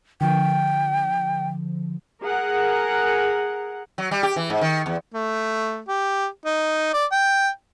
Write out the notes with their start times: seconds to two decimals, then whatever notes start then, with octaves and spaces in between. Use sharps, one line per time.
0.21 D3 F3 G5
2.22 G#4 A#4 F#5
3.98 F#3
4.11 G3
4.23 G4
4.36 E3
4.50 G#2
4.61 D#3
4.86 E2
5.15 A3
5.88 G4
6.46 D#4
6.93 D5
7.12 G5